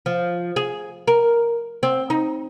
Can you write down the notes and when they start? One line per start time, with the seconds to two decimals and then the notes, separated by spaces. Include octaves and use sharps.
0.06 F3
0.56 G#4
1.08 A#4
1.83 C4
2.10 D#4